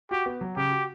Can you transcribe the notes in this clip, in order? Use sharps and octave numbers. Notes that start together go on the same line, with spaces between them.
F#4 G4
B3
F#3
C#3 G4
F#4